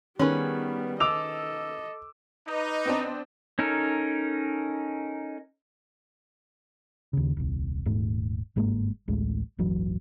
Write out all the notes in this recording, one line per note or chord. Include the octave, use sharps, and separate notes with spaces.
D#3 G3 B3 C#4 G#4 B4
A4 D#5 D6 E6 F7
D#4 B4 D#5 D6
B3 C4 D4
C#4 D#4 A4 A#4
D#2 C#3
D#1 C2
D#1 G#2 A3
G1 G#2 G#3 A#3
A1 D2 G#3 A3
D1 G1 E3 F#3